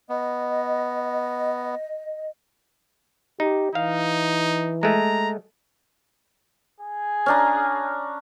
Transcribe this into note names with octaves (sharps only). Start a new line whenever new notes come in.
B3 D#5
D#4 G4
E3 D#4 F5
G#3 A3 A#5
G#4
C#4 D4 A#5